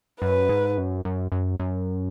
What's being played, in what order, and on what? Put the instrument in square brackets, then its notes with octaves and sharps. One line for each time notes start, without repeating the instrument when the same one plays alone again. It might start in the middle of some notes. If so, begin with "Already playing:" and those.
[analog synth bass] F#2 [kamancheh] B4
[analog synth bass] G#2
F#2
F#2
F#2
F#2